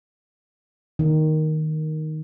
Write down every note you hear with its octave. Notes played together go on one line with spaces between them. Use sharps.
D#3